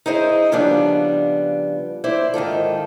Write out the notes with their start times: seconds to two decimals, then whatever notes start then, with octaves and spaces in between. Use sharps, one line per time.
0.06 D#4 E4 G#4 C5 D#5
0.52 C#3 F3 G3 B3 D4
2.04 E4 C5 D5
2.34 G#2 D#3 F4 A4